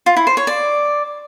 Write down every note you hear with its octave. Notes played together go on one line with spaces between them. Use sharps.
F4
E4
C5
C#5
D5